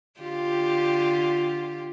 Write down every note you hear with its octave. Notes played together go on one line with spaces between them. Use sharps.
D3 F4 G4